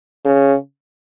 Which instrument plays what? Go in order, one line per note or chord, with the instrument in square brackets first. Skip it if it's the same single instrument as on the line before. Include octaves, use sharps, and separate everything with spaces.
[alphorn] C#3